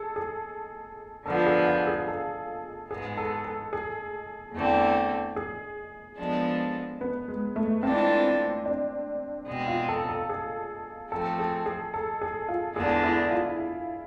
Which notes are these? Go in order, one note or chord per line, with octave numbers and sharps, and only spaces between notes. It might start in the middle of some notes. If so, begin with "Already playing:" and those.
Already playing: G#4 A4
G#4
D3 F3 B3 A4
G#4
F4
G#4
A4
G#2 G#3 B3 G#4
A4
A4
G#4
E2 D3 A3 C4
G#4
F3 G#3 B3 D4 A4
B3
G#3
A3
E3 G#3 C4 D4 F4 A4
D4
B2 G#3 C4
F4
A4
A4
G#4
F3 A3 C4 A4
G#4
G#4
A4
G#4
F4
E2 D3 G#3 D4 G#4
E4
F4